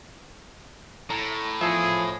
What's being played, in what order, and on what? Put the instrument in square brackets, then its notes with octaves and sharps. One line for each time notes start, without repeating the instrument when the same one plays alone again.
[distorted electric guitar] A2 [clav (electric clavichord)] A#5
[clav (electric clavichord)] E2 A4 E5 [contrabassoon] F3 [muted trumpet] G#4